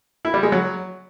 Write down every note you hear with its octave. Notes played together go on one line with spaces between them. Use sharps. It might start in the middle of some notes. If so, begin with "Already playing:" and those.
E4
G3
G#3
F#3